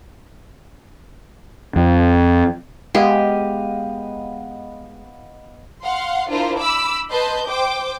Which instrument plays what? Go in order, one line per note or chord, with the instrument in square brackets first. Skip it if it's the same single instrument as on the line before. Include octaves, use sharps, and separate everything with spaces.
[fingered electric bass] F2
[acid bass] G#3 [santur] B3 D#5 F5 [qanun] G4
[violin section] F5 F#5 C6
D4 E4 F4 A#4 C5
B5 D6 E6
B4 D#5 A5 C6 G6
C5 G5 D6